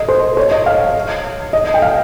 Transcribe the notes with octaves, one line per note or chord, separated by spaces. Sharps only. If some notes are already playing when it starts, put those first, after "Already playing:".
Already playing: D#5
C5
C#5
D#5
F5
D#5
G5
F5